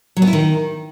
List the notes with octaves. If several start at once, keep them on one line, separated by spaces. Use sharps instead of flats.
F#3
B3
E4
D#3